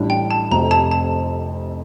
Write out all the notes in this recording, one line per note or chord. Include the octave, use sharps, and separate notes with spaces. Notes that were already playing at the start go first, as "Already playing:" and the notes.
Already playing: A1 A2 G3 D4
G5
A5
F1 F2 C3 A#5
A5
A5